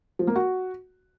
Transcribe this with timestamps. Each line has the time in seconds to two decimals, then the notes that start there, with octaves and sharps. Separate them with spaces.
0.19 F3
0.27 A#3
0.36 F#4